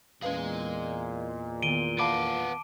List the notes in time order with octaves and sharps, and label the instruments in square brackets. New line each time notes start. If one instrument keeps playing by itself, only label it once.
[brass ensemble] E2 A#2 [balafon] C#4 B4 F5 [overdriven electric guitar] G#4 D#5
[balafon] D#3 B3 [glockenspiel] D7 D#7 G7
[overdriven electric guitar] B3 F5 [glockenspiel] A5 D6 D7 [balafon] B5